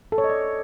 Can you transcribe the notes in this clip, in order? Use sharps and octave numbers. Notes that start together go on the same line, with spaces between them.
A4
C#5
D#5
D5